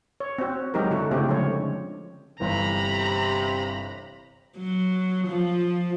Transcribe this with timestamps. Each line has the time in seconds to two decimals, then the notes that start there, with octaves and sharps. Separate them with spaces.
0.20 C#5
0.38 C4 F#4
0.74 F#3 G#3 D#4 G4 A#4
0.91 D3 E4 F#4 A4
1.11 C#3 A3 C4 E4 G4
1.28 D3 F3 G#3 C#5
2.40 G1 G2 C3 E3 A#5 B5
4.57 F#3
5.27 F3